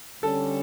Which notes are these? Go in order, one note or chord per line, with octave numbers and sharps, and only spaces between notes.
D3 G3 C#4 A4